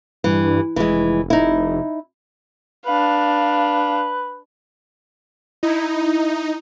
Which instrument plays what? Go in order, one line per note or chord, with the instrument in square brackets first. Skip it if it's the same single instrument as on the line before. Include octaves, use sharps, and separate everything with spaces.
[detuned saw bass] G2 [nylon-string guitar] E3
[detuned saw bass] F1 [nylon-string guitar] E3 G#3
[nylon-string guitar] D#4 E4
[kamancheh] D4 F5 [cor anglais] B4
[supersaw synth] D#4 [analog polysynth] E4